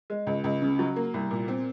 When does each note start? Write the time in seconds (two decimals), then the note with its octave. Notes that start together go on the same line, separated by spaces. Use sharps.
0.10 G#3
0.27 C#2
0.44 C#2
0.62 C#3
0.79 F#3
0.96 A#3
1.14 C2
1.31 A#2
1.48 C4